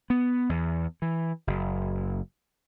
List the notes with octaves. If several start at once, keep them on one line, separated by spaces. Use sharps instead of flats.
B3
E2
E3
F#1